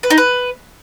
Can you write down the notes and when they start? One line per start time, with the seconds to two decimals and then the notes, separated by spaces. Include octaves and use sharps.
0.03 B4
0.10 D#4
0.18 B4